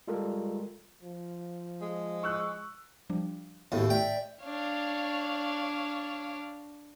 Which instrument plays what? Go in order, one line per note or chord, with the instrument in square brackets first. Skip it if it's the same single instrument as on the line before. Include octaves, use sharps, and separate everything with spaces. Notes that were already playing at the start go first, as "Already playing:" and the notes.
[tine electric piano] G3 G#3 F4 A4 A#4
[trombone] F3
[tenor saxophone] G#3
[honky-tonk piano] C#6 E6 F#6
[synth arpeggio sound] F3 G3 D4
[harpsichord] D#2 A2 [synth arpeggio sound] B3 D#5 [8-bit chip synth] E4 F#4 A4
[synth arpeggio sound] A3 E4 [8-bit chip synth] D5 E5 [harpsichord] G5
[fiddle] D4 [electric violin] C#5 F5